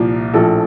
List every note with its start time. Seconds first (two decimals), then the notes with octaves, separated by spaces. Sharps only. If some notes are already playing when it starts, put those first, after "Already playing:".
Already playing: C2 A#2 F3
0.34 A#1 A2 F3 A4